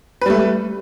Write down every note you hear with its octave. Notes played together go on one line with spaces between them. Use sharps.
G3 A3 B4